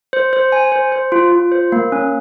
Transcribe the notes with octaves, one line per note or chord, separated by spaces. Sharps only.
C5
C5
G#5
C5
C5
F4
F4
C5
A#3
C#4